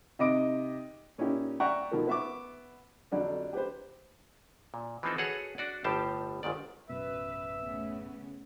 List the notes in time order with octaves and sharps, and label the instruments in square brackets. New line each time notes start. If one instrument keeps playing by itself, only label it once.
[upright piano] C3 D#4 D#5 D6 D7
[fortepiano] A#2 C#4 D#4 E4 G4
D5 E5 F#5 G5 A#5 C#6
B2 D#3 F3 A3 A#3
B3 E5 C#6 D6
F2 D3 F#3 G3 D4
G4 B4 C5
[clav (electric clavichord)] A#2
E3 F3 B3 C4 D#4 A4
F#4 G#4 A4 B4 C#5 F#5
D4 F#4 D5
G1 A2 G3 G4 C5 A5
G1 G#2 D#3 D5
[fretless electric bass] A1 F#2 B2 [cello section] B4 [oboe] E5
[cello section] C#3 A3 B3